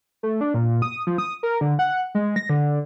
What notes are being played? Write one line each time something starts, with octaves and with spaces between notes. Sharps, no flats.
A3
D4
A#2
D#6
F3
D#6
A#4
D3
F#5
G#3
A#6
D3